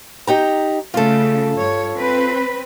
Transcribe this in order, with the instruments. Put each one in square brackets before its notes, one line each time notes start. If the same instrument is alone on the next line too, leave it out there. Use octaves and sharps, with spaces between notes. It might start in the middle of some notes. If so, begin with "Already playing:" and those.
[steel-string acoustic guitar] D#4 G4 A#5
[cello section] C#3 A3 [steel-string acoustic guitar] F4 A4
[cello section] G2 C#5
C4 B4